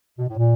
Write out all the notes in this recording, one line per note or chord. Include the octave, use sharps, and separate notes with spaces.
B2
A2
A#2